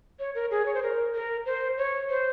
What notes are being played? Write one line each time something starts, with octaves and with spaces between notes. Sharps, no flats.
C#5
A#4
G#4
C#5
C5
A#4
A#4
C5
C#5
C5